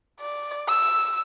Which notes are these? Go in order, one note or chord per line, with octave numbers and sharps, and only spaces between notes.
D5
E6